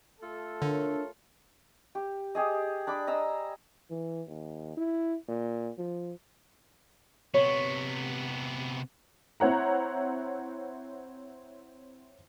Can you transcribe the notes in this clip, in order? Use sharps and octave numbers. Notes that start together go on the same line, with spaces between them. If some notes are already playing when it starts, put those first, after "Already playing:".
A3 F4 A4
D3 D4 A#4 C#5
G4
G4 G#4 D#5
D4 B5 D6
D#5 A#5 E6
E3
D#2
E4
A#2
F3
C3 B3 C#5
C4 E4 C#5 F#5 A#5